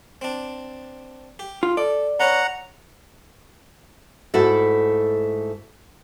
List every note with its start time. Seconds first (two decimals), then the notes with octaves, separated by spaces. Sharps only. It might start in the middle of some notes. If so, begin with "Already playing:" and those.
0.21 C4 D4
1.39 G4
1.63 F4
1.77 A4 D5
2.20 C#4 B4 C#5 F#5 A#5
4.34 G#2 A3 E4 F#4 A4